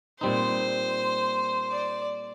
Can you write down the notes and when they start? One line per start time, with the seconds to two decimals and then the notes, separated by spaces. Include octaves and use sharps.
0.21 A#2 G3 C4 D#4 C5
1.71 D5